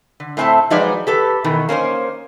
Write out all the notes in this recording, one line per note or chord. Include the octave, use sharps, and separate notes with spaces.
D3
A2 A3 C4 G#5 A5
F3 F#3 G#3 D#4 B4 D5
G4 A4 B4
B2 D#3 E3
A#3 C#4 D#4 C5